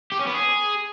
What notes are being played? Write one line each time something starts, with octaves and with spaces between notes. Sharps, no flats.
G4
C#4
B3
G#4